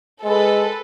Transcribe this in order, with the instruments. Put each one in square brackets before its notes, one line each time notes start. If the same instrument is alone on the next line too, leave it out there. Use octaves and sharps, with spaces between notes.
[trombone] G#3 [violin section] A4 B4